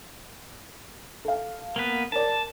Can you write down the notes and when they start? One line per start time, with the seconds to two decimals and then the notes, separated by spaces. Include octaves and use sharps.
1.25 A4 F5
1.76 A#3 B3 B4
2.12 A#4 D5 A5